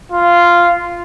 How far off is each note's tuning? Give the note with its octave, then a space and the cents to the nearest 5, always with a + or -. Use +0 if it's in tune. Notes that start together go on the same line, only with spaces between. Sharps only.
F4 -10